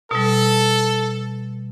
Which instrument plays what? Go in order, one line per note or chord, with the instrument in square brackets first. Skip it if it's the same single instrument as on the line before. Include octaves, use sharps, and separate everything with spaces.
[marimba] B2 G3 [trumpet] A4